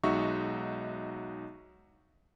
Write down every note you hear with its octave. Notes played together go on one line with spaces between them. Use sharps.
B1 G#3 D#4 F#4 E5 C#6